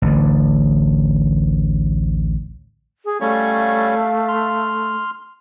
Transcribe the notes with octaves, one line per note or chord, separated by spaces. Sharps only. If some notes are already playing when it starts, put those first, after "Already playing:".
A1 D2 D3
G#4
G3 A3 C#4 C#5 F5
C6 F6